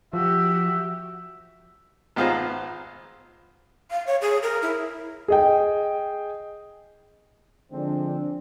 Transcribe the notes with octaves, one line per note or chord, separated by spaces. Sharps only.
F3 F#4 G4 E5
G#1 B3 F4 G#4 C5 A#5
F5
C#5
G#4
A#4
E4
G#4 D#5 G5
D3 F3 G#3 C4 D4